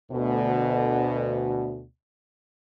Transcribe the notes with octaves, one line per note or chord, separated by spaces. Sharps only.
D2 B2